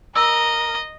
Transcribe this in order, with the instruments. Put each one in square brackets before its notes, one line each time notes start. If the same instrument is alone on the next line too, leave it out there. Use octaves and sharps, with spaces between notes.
[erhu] A#4 [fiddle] D#5 [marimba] E6